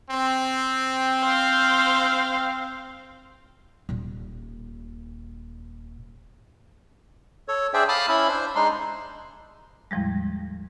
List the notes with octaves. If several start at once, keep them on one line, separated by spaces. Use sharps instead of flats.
C4
C5 F5
D#1 A#2
A4 C#5
D4 G#4 C5 D5 E5 G5
F5 A5 B5 D6 D#6 F6
C#4 E4 E5 B5
D4 C5
G#3 D4 D#4 C6
E2 A2 F3 G3 G#3